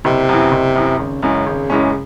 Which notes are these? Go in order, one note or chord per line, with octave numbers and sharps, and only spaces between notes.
F#1 C3
F#2 E3
F#1
F#2 E3
G#1 C#3
F#2 C#3 E3 G#3 C#4
G#1
F#2 E3 G#3 C#4